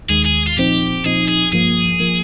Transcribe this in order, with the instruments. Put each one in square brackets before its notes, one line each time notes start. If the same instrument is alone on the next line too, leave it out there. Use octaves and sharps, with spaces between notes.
[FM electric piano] D#2 D#3 G#3 [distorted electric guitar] G#4
[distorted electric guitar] G#4
F4
[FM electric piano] A#2 F3 C4 D#4 [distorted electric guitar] G4
[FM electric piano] A#2 F3 C4 D#4 [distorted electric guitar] G#4
[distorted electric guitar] G#4
[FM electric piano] G2 F3 A#3 [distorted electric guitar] G#4
[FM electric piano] F3 A#3